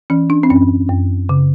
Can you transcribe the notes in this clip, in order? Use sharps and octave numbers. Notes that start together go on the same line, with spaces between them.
E3 C#4
D4
C4
F#2 C#4
F#2
C#3